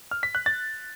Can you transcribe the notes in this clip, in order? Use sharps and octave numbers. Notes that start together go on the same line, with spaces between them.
F6
B6
F#6
A6